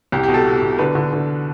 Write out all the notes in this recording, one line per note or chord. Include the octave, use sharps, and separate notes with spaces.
C2 G4
G4
B2
A4
B2
B2
D3 B4
D3
D3